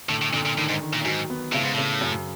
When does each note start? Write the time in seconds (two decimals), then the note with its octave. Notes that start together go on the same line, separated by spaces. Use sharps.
0.09 A2 D3
0.22 A2
0.33 A#2 D3
0.46 A#2
0.58 A2 D#3
0.69 G#2
0.82 D#3
0.93 A#2
1.05 G#2 F#3
1.30 B3
1.53 A2 C#3
1.63 G#2
1.73 A2 C#3
2.01 F#2